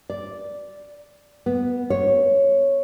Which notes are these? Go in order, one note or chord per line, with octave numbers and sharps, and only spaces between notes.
D5
B3
C#5